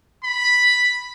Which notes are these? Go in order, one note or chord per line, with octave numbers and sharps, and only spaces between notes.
B5